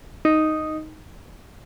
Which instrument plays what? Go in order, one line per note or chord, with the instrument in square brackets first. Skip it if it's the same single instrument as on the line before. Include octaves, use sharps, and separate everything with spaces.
[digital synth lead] D#4